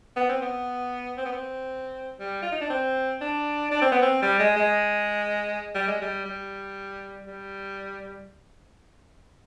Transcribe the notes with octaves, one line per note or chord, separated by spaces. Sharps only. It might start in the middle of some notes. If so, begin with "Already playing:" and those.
B3
C4
B3
C4
B3
C4
G3
F4
D#4
D4
C4
D4
D4
C4
B3
C4
G3
G#3
G#3
G3
G#3
G3
G3
G3